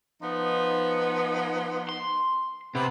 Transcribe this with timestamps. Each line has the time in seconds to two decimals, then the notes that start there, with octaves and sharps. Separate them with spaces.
0.22 F3 B3 D#4
1.89 C6
2.75 C3 B3